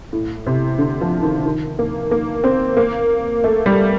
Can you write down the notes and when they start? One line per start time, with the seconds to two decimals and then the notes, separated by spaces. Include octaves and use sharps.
0.13 A2
0.46 C3
0.78 D3
1.01 F3
1.23 D#3
1.46 D#3
1.79 A#3
2.11 A#3
2.44 C4
2.77 A#3
3.44 A3
3.66 G3